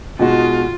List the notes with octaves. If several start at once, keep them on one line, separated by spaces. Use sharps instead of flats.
B2 G#3 D#4 F4 F#4